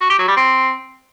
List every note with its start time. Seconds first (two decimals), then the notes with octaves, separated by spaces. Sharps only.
0.01 F#4
0.10 G4
0.19 F#3
0.28 G3
0.37 C4